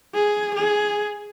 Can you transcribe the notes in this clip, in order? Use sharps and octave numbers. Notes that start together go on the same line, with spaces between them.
G#4
G#4